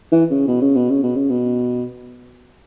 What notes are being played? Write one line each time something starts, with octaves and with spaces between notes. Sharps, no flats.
E3
C#3
B2
C#3
B2
C#3
B2
C#3
B2